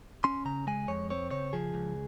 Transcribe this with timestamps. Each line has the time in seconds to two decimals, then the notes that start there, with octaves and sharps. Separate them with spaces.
0.24 C#4 C6
0.45 C#3 A#5
0.67 G#3 G#5
0.88 F2 C#5
1.10 C4 C#5
1.31 C#3 C#5
1.53 F3 G#4
1.74 C#2